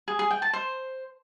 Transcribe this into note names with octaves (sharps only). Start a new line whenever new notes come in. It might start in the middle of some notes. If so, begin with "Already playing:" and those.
G#4
G#4
G5
A5
C5